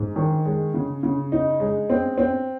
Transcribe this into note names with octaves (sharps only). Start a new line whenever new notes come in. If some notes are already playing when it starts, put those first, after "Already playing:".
Already playing: G#2
D#3
G#3
C#3
C#3
D#4
G#3
C4
C4